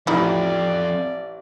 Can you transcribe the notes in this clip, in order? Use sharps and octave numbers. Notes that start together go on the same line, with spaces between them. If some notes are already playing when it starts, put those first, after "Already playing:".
A1 F2 D#4 E4 D5